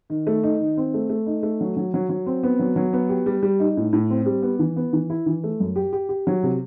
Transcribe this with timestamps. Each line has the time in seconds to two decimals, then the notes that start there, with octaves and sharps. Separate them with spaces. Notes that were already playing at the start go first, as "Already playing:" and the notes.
0.10 D#3
0.27 A3
0.43 D#4
0.60 D#3
0.77 C4
0.94 A3
1.09 A3
1.27 D#4
1.43 A3
1.61 F#3
1.77 F#3
1.94 F#3
2.09 F#3
2.26 C4
2.43 B3
2.59 F#3
2.76 F#3
2.93 B3
3.09 G4
3.26 G3
3.43 G3
3.60 D#4
3.77 A2
3.93 A2
4.10 C4
4.26 G3
4.42 B3
4.59 E3
4.76 B3
4.93 E3
5.10 E4
5.26 E3
5.44 A3
5.60 F#2
5.76 G4
5.93 G4
6.09 G4
6.27 F#3
6.43 C3